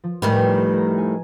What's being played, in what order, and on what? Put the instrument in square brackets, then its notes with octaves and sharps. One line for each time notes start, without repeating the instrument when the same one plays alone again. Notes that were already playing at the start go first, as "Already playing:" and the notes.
[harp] F3
[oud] A2 D#3 G3 [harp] B4 C5 G#5
[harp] A#5
G#5